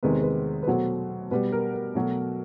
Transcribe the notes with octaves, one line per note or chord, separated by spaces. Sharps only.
E2 C3 D#3 G#3 B4
C5
B4
B4
B2 F#3 A3 C5
B2 G3 B4
A#4
A#4
B2 F#3 A3